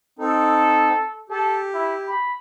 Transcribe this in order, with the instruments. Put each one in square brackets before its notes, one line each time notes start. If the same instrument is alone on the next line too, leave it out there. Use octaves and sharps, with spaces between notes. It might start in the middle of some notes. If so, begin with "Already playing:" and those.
[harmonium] C4 D#4 [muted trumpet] A4
[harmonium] G4 [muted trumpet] A4
[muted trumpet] E4
B5